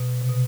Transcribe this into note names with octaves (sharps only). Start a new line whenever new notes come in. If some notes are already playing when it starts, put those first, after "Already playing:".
Already playing: B2
C3
B2